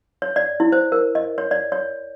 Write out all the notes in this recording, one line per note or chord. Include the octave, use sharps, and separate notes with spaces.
C#5
D5
E4
C5
A#4
D#5
C#5
D5
C#5